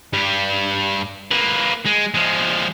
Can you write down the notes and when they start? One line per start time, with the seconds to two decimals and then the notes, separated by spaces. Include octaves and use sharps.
0.13 G2 G3
1.31 A#3 B4
1.86 G#3
2.14 F3 G#3